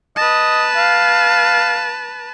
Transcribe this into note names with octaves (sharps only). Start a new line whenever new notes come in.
B4 D#5 A5
F5